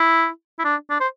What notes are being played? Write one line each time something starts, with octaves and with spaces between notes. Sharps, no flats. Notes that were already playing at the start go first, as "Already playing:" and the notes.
Already playing: E4
E4
D4
D4
C5